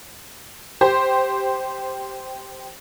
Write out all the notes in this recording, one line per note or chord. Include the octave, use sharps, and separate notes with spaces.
G4 C5